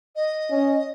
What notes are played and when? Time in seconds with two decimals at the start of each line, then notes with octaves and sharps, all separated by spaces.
0.15 D#5
0.50 C#4